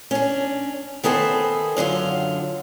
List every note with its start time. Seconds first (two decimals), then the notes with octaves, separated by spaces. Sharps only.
0.11 C#4 D4
1.04 D#3 B3 G#4 A4 C5
1.77 F#2 D3 F#3 F4